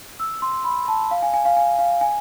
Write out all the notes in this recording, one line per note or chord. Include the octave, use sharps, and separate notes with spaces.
E6
C6
B5
A5
F5
G#5
G#5
F5
G#5
F5
G#5